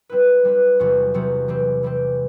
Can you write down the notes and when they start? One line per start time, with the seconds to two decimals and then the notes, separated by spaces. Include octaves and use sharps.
0.09 G3 C4 E4 B4
0.45 G3 C4 E4 B4
0.79 E2 C3 F#3 C4 F#4
1.14 E2 C3 F#3 C4 F#4
1.48 E3 G3 C4 G4
1.83 E3 G3 C4 G4